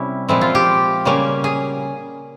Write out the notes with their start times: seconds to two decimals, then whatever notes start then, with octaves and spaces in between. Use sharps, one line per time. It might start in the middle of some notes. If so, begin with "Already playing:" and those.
Already playing: C3 G3 C#4 E4
0.29 A#2 F3 G#3 C4 E4
0.41 F4
0.55 G4
1.05 C#3 G3 A#3 C#4
1.44 G#4